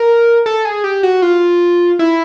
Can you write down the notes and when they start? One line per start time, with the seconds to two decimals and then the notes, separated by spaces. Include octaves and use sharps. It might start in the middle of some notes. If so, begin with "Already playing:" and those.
Already playing: A#4
0.46 A4
0.65 G#4
0.84 G4
1.03 F#4
1.22 F4
1.99 E4